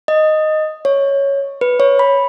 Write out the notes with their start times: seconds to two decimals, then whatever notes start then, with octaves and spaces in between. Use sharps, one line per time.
0.08 D#5
0.85 C#5
1.61 B4
1.80 C#5
1.99 B5